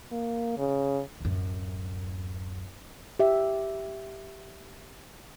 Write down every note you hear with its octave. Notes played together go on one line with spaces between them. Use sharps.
A#3
C#3
D1 F#2
G4 E5